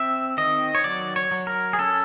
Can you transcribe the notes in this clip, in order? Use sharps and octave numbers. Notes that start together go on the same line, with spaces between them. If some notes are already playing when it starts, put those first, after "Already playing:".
Already playing: C4 E5
D#3 D#5
C#5
F#3 D5
C#5
F#3
A#4
G#4
C#4 A4